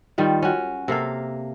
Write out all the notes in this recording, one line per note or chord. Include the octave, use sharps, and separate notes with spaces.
D#3 G3 F4
C#4 F#4
C3 A#3 A4 F5